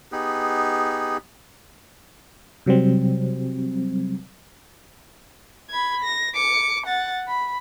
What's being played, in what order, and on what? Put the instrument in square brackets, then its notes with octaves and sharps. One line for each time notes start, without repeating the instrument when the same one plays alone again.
[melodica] B3 D#4 G4 G#4
[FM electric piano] C3 F#3 G3 C4
[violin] B5 G#6
A#6
D6 C#7
F#5 A6
B5